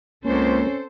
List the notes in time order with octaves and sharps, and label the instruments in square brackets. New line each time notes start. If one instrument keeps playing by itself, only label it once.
[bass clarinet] C#2 [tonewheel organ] A#3 [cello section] C4 A4 C5 [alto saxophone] C#4